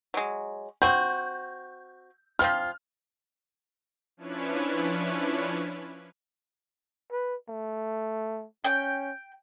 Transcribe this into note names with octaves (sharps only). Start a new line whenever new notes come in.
F#3 G#3
C4 F#4 G6
F3 C4 F4 F6
F3 C#4 D4 E4 B4 C#5
B4
A3
C#4 G5